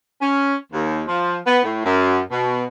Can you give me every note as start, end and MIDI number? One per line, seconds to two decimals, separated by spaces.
0.21 0.55 61
0.73 1.02 39
1.07 1.37 53
1.47 1.61 59
1.63 1.83 45
1.84 2.19 42
2.31 2.64 47